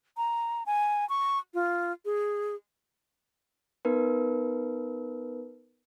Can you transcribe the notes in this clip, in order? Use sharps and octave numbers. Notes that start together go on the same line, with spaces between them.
A#5
G#5
C#6
F4
G#4
B3 D#4 A#4 B4